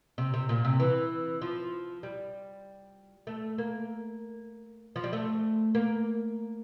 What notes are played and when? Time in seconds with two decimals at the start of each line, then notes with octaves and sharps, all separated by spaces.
0.18 C3
0.34 C3
0.49 A#2
0.65 C3
0.80 E3
1.42 F3
2.03 G3
3.27 A3
3.58 A#3
4.96 F3
5.04 G3
5.13 A3
5.75 A#3